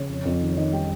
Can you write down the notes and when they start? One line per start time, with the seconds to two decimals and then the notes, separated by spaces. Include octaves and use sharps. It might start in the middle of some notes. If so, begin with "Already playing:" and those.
Already playing: C#3 C#5
0.09 F2
0.25 F2
0.41 D#3
0.57 D#3 D#5
0.72 G3 G5